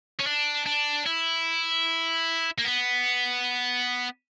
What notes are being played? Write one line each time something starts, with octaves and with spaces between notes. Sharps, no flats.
C#4
D4
D4
E4
A#3
B3